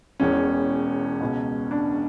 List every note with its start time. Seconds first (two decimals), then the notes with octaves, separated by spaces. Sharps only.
0.20 E1 E2 B2 C#4
1.21 C#2 B2
1.71 D4